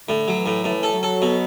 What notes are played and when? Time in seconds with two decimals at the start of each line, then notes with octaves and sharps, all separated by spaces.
0.08 A2 D3
0.28 F#3
0.37 E3
0.46 A2
0.64 A2 E3
0.83 A4
0.94 F#3
1.03 A4
1.22 B2